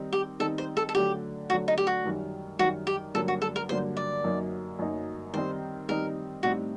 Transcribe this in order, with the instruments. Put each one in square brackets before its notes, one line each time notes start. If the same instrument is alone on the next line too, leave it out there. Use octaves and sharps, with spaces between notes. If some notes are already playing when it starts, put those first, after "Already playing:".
Already playing: [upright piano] D#3 G3 C4 D#4
[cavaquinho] G4
[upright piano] D#3 G3 C4 D#4 [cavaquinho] A4
[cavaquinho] C5
A4
A4
[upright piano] D3 F#3 A3 [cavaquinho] G4
[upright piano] D3 F#3 A3 [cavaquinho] F#4
[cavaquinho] D#4
G4
F#4
[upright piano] F#2 D#3 G3
[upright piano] F#2 D#3 G3 [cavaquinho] F#4
[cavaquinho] G4
[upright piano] G2 D3 F#3 A#3 [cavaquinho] A4
[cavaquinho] F#4
A4
A#4
[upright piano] G2 D3 F#3 A#3 [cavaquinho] C5
[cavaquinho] D5
[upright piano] F#2 F#3 A#3 D#4
F#2 F#3 A#3 D#4
[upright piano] D#3 G3 C4 D#4 [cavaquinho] C5
[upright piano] D#3 G3 C4 D#4 [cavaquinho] A#4
[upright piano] A2 G3 C4 D#4 [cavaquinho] F#4